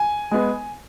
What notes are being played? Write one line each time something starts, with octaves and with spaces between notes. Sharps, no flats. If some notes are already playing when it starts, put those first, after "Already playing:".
Already playing: G#5
G#3 B3